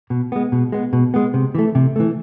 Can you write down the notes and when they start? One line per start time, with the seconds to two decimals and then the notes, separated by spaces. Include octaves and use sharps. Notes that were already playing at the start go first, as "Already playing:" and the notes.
0.10 B2
0.32 G#3 B3
0.52 B2
0.72 G#3 B3
0.93 B2
1.14 G#3 B3
1.34 C3
1.55 E3 A3
1.75 C3
1.96 E3 A3